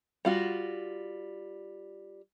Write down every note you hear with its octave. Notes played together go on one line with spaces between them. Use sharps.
G3 F4 F#4